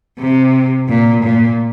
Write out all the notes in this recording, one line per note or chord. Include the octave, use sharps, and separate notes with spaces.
C3
A#2
A#2